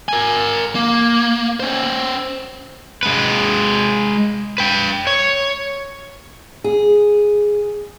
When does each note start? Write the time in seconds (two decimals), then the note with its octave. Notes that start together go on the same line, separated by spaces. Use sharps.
0.09 A#4 G#5
0.75 A#3
1.60 C#4 C5
3.03 G#3 B4
4.58 B4 G5
5.07 C#5
6.64 G#4